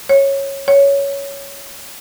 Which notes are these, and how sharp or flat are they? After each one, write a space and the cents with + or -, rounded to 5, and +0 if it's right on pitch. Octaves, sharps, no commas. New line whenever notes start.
C#5 -10
C#5 +10